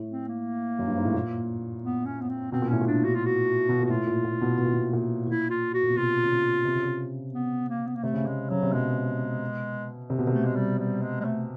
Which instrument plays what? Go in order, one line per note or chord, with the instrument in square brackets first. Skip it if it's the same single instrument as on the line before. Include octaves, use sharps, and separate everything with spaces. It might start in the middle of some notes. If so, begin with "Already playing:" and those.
Already playing: [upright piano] A2
[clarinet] C4
A#3
[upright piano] F#2
G2
G#2
A2
A#2
[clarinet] B3
C#4
B3
C4
[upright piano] B2 [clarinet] C4
[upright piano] A#2
[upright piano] A2 [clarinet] C#4
[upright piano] A#2
[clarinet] D4
F#4
F4
F#4
[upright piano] B2
A#2
[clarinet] F#4
[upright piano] A2 [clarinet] F4
[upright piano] A#2
A#2
B2
B2
A#2
B2
A#2
[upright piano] A#2 [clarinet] E4
[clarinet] F4
F#4
[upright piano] A#2
B2
[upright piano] C3 [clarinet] F4
[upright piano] C#3
C3
C3
C#3
C3
[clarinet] B3
A#3
B3
A#3
[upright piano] C3 [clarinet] A3
[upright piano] C#3
[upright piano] C3 [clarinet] G#3
[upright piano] C#3 [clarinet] F#3
[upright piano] C3
[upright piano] B2 [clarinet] G#3
[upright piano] C3
B2
C3
[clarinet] A3
G#3
G3
G3
G#3
G#3
A3